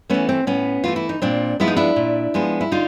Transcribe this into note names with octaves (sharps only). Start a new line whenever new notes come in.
E3 A3 B3 C#4
C4
A2 B3 C#4
E3 A3 F4
E4
D#4
A#2 C4 D4
F3 G#3 B3 E4
D#4
D4 E4
A#2
F3 G#3 B3
E4
D3 D#4 F4